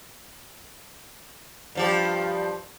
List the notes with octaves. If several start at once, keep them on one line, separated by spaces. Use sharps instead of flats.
G2 F3 G4